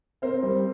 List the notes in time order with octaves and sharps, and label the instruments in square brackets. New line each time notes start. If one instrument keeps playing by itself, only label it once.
[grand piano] C4 A#4 C5
G3